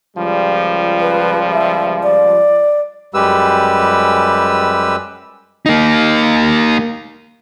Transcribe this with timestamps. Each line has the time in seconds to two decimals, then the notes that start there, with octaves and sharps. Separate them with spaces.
0.16 C#2 F3 G3
1.00 B4
1.53 E5
2.03 D5
3.14 F#2 G3 G#3 G4 B4 E6
5.66 A#3 D#4